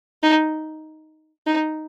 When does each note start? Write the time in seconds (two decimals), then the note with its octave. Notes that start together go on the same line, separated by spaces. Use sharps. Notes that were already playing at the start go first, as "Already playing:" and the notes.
0.23 D#4
1.47 D#4